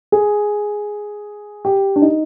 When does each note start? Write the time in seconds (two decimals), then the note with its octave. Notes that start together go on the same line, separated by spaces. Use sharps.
0.12 G#4
1.65 G4
1.96 D4
2.02 D#4